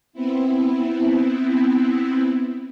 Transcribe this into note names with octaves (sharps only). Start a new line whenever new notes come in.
B3 C4 E4